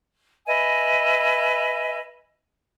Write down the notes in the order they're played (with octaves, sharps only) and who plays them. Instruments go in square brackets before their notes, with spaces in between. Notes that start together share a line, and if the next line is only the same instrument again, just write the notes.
[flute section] B4 D#5 E5 G#5